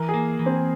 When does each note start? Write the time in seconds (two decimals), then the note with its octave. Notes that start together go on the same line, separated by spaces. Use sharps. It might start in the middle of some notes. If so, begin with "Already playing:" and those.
Already playing: E3 A#4
0.09 G#4
0.14 A#3
0.39 E3
0.46 C4